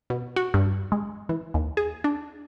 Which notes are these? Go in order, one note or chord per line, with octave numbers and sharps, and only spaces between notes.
B2
F#4
G2
G#3
E3
D#2
G#4
D4